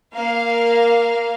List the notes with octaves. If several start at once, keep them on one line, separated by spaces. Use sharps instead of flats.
A#3 F5